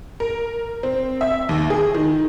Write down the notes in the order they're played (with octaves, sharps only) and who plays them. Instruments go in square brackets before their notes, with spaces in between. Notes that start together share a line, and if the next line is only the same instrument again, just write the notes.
[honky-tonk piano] A#4
C4
E5
D#2
G#4
D#3